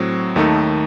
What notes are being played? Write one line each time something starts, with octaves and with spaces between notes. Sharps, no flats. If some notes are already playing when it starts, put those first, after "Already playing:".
Already playing: A2 F#3 C4
D#2 D#3 A3 D#4 A4